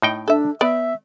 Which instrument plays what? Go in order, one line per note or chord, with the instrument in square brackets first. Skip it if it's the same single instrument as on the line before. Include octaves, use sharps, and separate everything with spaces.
[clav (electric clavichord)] A2 D#4 G5
[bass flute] D4 [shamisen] A4 E5
[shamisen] B3 [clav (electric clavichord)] D5 [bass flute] E5